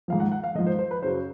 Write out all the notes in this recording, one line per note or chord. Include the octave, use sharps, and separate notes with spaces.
G#2 F3 F5
F#5
F#5
F5
G#2 F3 D#5
C5
C5
B4
F#2 C#3 F#3 C5